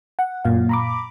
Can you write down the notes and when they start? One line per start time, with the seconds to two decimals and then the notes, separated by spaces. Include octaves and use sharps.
0.19 F#5
0.45 F#2 A#2 F5
0.69 A#5 B5 D6